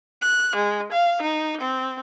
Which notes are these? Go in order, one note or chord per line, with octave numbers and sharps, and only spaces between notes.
F#6
G#3
F5
D#4
C4